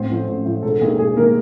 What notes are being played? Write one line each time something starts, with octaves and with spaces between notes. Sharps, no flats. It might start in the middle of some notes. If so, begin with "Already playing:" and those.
Already playing: A1 C4 C5
A2 F3
A1
A2 F3
E1 A4
D#2 D#3 G#4
E1 G#4
D#3 A#3 A#4